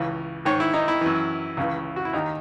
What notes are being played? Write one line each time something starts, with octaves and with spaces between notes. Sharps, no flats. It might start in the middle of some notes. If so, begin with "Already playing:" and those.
Already playing: C#2 C#3 E3
G#2 D#3 C#5
E4
D#4
E4
F#2 E3
C#2 C#3 E3
F#4
E4
D#2 D#3 D#4